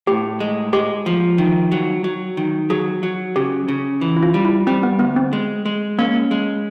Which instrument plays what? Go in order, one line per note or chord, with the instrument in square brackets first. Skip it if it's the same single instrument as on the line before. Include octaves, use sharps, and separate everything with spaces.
[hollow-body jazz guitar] A2 [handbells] G4
[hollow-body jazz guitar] G#3
[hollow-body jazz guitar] G#3 [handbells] G4
[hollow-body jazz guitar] F3
D#3
F#3
F#3
D#3
[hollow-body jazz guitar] F#3 [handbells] G#4
[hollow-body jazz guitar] F#3
[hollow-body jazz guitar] C#3 [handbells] G4
[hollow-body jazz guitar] C#3
E3
[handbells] E4
F4
[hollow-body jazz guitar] G3
[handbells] E4
[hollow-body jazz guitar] G3 [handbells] C4
[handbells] B3
[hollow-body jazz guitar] D2 [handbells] B3
[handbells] C4
[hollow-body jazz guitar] G#3
G#3
[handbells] A#3 [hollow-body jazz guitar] C#4
[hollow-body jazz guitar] G#3